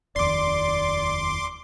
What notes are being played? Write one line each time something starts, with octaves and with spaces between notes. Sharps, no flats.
F1 D#2 D5 C6 D6